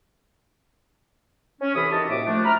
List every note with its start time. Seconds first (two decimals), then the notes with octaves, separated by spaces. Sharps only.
1.61 C#4
1.75 C2 E3 A4 C#5 B5 D#6
1.91 D#3 F#4 G4 A5
2.09 C2 A2 A#3 E5 D6
2.25 F3 A3 D4
2.45 A#5 B5 F6